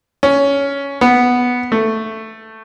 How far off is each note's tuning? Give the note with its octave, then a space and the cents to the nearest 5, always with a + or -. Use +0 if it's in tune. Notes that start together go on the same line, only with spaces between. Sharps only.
C#4 +10
B3 +0
A3 +5